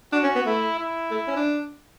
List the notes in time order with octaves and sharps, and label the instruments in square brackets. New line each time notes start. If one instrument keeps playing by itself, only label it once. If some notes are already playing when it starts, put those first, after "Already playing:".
[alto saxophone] D4 [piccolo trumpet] F#4
[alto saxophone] C#4
B3
[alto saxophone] A3 [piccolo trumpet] E4
[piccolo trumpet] E4
[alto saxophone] A3
C#4
D4